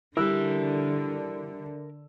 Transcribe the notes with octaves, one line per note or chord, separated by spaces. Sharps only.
D3 G3 E4 A#4 E5 E6 F#6